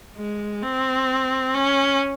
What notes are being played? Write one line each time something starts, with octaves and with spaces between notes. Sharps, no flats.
G#3
C4
C#4